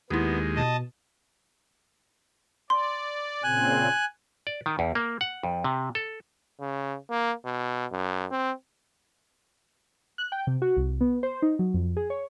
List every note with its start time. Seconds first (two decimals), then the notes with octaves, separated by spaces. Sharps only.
0.10 D#2 G#3 B3 E4 G4
0.56 B2 D#5 A5
2.70 D5 C6
3.43 A#2 C#3 C4 G#5 F#6
4.47 D5
4.66 D#3
4.79 E2
4.95 A#3
5.21 F#5
5.43 F2
5.64 C3
5.95 A4
6.60 C#3
7.10 A#3
7.45 B2
7.91 F#2
8.31 C4
10.18 F#6
10.32 G5
10.47 C3
10.62 F#4
10.77 C2
11.01 B3
11.23 C5
11.42 D#4
11.59 F#3
11.74 F2
11.97 G#4
12.10 C#5